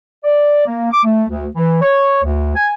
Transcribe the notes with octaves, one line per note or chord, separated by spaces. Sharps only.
D5
A#3
D6
A3
D2
E3
C#5
D2
G#5